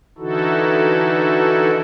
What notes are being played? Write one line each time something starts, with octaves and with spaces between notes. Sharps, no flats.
D3 E3 D#4 E4 F#4 A4